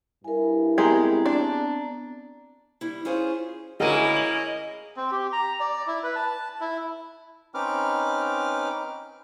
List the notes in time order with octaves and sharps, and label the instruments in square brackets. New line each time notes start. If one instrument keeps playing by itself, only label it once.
[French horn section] G2 E4 [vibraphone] A#4 G#5
[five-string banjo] G#3 G4 G#4 [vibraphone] B3 C4 A#5
[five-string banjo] D4
[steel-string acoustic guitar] G3 E4
C#4 F4 G#4 C5 C#5
[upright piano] D2 A#4 D#7 [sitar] A#3 C#4 E4 [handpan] G#4 [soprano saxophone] D#5
[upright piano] F#7
[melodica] C4
G4
A#5
D5
E4
B4
A5
E4
[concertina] C4 C#4 D#4 B4 D6 F6